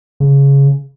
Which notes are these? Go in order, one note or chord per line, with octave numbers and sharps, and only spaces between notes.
C#3